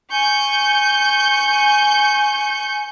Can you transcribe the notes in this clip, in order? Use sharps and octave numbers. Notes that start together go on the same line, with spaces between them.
G#5 C#6 G6